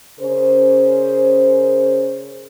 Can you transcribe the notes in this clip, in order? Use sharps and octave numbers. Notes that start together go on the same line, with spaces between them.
C#3 C#4 G#4 A#4 C5